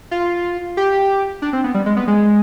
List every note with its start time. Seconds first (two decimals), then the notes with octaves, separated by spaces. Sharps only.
0.11 F4
0.77 G4
1.42 D4
1.53 C4
1.64 B3
1.74 G3
1.86 G#3
1.97 B3
2.08 G#3